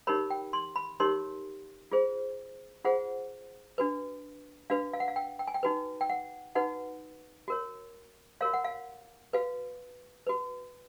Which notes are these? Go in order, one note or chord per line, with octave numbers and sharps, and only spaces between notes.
D#4 G4 A#4 C#5 B5
G5
C6
B5
D#4 G4 A#4 C#5 C6
F4 G#4 C5
F4 G#4 C5 F#5
D4 F#4 B4
D4 F#4 B4 F5
F5
F#5
F5
G5
G5
G#5
G5
D#4 F#4 B4
G5
F#5
D#4 F#4 B4 F#5
F#4 A#4 C#5
F#4 A#4 C#5 F5
F#5
F5
F#4 B4 F5
F#4 B4